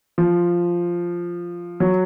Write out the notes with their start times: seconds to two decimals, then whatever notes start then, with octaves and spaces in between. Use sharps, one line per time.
0.18 F3
1.80 F#3